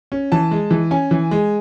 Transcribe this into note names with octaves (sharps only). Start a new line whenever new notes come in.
C#4
E3 A5
G#3
E3
C#4 G#5
E3
G#3